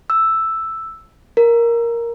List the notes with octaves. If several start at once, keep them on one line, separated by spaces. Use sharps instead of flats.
E6
A#4